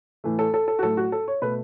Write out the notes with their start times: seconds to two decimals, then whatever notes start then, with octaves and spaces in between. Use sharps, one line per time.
0.24 A2 E3 A3
0.39 A4
0.54 A4
0.68 A4
0.79 F#4
0.83 A2 F#3 A3 A4
0.97 F#4
1.12 A4
1.28 C#5
1.42 B2 A3 B4